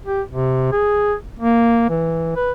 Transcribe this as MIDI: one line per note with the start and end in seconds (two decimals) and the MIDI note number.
0.06 0.22 67
0.31 0.68 48
0.72 1.14 68
1.39 1.86 58
1.89 2.34 52
2.36 2.52 71